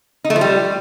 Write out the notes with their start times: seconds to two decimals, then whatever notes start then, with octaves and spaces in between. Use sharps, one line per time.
0.24 D#4
0.30 A3
0.36 F3
0.41 G3